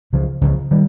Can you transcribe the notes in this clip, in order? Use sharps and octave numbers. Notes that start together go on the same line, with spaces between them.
C#2 C#3 F3
C#2 C#3 F3
D#3 G3